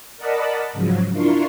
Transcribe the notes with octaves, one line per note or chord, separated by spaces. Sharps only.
A#4 D5 D#5 F#5 A5 B5
G#2 C#3 F3 F#3
D4 E4 F4 A#4 C6 C#6